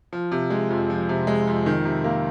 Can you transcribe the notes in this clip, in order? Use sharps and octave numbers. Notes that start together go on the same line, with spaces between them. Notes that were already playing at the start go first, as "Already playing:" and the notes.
F3
C3
G#3
F2
F3
C3
G#3
F2
D#3
C3
A#3